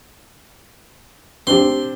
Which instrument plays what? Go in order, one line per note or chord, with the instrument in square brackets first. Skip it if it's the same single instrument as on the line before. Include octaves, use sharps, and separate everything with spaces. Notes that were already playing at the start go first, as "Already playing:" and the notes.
[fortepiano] C4 D4 G4 [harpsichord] C6